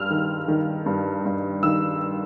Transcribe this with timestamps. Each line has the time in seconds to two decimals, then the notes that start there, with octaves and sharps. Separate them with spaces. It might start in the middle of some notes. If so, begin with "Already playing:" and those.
Already playing: G2 E6 F6
0.10 D#3
0.48 D#3
0.86 G2
1.25 G2
1.63 D#3 E6